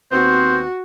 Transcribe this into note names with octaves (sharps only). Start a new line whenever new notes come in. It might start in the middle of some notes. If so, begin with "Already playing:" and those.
D#2 B3 C4 F#4 C5